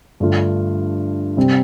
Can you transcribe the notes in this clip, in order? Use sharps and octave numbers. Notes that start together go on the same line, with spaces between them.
G2 D3 A3 F4
C3 G3 C4